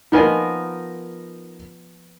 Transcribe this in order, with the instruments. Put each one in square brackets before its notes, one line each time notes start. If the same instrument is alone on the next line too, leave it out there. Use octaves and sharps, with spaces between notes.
[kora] F3 B3 F4 [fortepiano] D#4 A#4 G#5